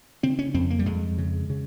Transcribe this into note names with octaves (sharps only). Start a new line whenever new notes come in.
C#3 C4
C#4
F2 C4
A#3
G3
F2 G#3
C#3
C#3